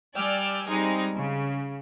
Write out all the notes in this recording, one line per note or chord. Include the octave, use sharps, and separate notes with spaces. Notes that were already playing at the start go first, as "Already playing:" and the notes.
G3 D5 G5 G#5 E6 F6
G3 G#3 C4 D#4 G#4
C#3